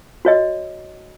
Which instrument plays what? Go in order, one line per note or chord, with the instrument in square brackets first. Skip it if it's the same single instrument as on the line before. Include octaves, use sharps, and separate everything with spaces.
[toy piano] F#4 C#5 D#5